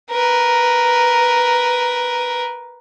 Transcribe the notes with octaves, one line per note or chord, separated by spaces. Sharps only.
A#4 B4